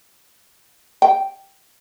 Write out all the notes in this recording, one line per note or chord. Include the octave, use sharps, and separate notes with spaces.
G5